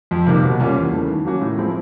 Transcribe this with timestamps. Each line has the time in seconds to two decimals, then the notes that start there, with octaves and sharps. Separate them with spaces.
0.11 F2
0.26 C3 D#3 G3 A#3
0.43 B2
0.60 G3 A#3 C#4 F4
0.77 E2
0.93 C#3 E3 A3
1.08 D#3
1.25 F#3 A#3 C#4 F#4
1.41 A2
1.58 F3 G#3 C4 E4